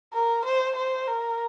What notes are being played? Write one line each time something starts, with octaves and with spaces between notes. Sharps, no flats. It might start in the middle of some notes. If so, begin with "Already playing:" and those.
A#4
C5
C5
A#4